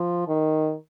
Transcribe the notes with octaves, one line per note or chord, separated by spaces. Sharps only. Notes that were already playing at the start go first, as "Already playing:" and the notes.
Already playing: F3
D#3